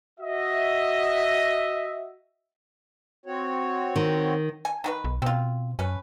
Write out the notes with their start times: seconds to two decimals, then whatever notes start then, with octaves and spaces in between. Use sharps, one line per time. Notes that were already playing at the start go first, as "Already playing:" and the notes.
0.20 F#4 D#5 E5
3.26 C4 F#4 C#5
3.96 D#3
4.65 G#5
4.84 D#3 F#4 B4
5.04 B1
5.22 B2 C4 F4
5.79 F#2 C#4 B4